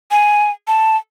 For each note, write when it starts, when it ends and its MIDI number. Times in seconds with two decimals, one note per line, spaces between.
0.11 0.51 80
0.67 0.96 81